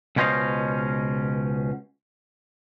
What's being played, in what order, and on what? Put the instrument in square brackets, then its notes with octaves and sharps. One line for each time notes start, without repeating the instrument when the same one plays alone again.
[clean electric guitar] C#2 B2 C#4 C5 D#5 F5